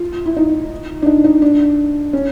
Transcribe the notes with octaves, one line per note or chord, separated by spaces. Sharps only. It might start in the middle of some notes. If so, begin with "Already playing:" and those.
Already playing: F4
E4
D#4
D4
D#4
D#4
D4
C#4